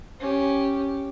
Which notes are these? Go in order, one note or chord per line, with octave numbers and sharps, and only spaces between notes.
C#4 G4